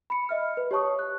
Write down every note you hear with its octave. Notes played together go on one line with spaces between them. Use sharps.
B5 C#7
D#5 E5 F6
B4
G4 C#5 A5 C#6 D#6
F#6